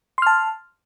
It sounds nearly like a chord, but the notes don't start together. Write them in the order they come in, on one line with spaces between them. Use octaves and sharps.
C6 F6 A5